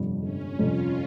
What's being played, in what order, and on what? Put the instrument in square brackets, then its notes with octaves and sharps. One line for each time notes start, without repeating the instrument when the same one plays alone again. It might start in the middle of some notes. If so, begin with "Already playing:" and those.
Already playing: [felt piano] G1 F2 C3 G3
[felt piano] G1 [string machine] C#4
[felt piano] F2 C3 G3 [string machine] F4